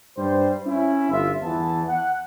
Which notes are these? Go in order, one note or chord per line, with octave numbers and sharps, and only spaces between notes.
G2 G3 C5
C#4 E4
G1 F4 E5
E2 E3 B3 A5
F#5